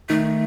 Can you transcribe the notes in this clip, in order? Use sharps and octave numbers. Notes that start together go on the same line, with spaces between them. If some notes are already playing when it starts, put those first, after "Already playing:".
D#3 A3